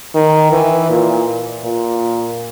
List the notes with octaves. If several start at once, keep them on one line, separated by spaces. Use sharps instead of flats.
D#3
E3
A#2
A#2